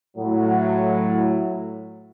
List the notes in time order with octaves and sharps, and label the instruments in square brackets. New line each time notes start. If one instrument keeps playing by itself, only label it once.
[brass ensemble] A2 F#3